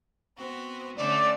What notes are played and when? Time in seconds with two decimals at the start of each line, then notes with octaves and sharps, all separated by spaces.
0.36 B3 C4 F#4
0.97 D3 A3 C#4 D5